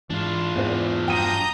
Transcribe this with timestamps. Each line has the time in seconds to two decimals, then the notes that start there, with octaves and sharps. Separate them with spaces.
0.10 G#2 E3 D4 F4
0.55 E2 G#2 C5
1.08 D#1 G2 F#3 G5 A#5 D#6 G6 D#7